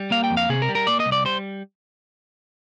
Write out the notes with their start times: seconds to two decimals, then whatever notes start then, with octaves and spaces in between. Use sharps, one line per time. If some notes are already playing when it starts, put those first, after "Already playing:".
Already playing: G3
0.11 A#3 F5
0.24 G5
0.31 F2
0.37 F5
0.49 C3 G#4
0.62 A#4
0.69 G3
0.75 A#4
0.87 A#3 D5
1.00 D#5
1.06 C2
1.12 D5
1.25 G3 C5